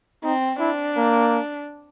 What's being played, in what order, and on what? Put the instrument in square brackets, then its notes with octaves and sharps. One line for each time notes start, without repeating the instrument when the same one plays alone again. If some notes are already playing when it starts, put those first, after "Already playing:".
[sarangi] C4 [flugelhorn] D#4
[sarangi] D4 [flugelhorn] E4
[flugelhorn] A#3